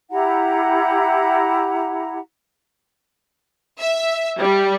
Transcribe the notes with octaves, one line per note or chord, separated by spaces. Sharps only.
E4 G4 F#5 A#5
E5
G3